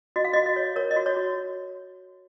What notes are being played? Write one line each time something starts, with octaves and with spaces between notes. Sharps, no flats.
F#4 D#5
F5
D#5
F#4
D#5
C#5
A#4 C#5
D#5
F#4
C#5
F#4